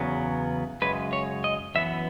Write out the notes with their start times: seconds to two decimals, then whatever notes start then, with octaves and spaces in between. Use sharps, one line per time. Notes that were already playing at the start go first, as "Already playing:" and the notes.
Already playing: E2 C#3 F#3 B3
0.82 F#2 C#3 G#3 B4
1.13 C#5
1.44 D#5
1.75 F#2 E3 B3 E5